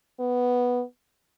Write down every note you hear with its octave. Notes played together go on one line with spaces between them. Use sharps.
B3